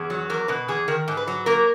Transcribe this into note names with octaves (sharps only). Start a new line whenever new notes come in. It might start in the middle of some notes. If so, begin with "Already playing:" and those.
Already playing: E2 G#4
F#3
E2 A#4
B2 B4
E2 G#4
D#3 A#4
G#2
B4
F#3
A#3 A#4